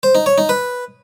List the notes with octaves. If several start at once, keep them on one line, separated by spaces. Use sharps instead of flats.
C5
D#4
C#5
D#4
B4